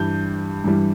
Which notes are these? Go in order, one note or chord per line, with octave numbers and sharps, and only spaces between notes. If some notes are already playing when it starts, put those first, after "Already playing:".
Already playing: G2 E3 G3 G6
G2 E3 G3